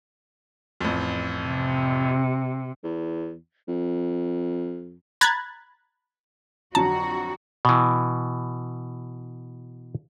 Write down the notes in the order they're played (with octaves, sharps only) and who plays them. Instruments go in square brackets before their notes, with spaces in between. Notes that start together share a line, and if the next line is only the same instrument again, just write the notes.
[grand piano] A1 F2
[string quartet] C3
[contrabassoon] E2
F2
[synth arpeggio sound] A#5 B5 F#6 G#6 A6
[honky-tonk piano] F2 D3 F#3 [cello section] F#4 [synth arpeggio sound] A5 [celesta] A#5
[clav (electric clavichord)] B2 E3